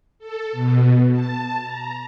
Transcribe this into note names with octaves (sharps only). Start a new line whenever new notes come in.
A4
B2
A5
A#5